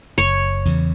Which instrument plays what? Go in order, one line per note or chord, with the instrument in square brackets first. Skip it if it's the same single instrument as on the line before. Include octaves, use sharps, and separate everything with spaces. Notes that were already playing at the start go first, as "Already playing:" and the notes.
[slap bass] F#1 [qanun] C#5
[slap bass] E2 C#3 E3